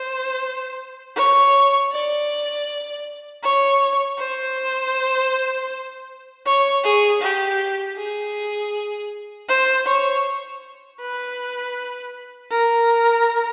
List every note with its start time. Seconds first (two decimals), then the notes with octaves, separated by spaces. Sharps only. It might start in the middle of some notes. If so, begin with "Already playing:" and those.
Already playing: C5
1.16 C#5
1.92 D5
3.43 C#5
4.19 C5
6.46 C#5
6.84 G#4
7.22 G4
7.97 G#4
9.49 C5
9.87 C#5
11.01 B4
12.51 A#4